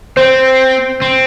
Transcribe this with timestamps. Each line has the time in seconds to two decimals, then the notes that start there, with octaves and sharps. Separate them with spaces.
0.17 C4 C5
1.02 C4